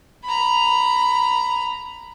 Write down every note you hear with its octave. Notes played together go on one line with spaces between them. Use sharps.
A#5 B5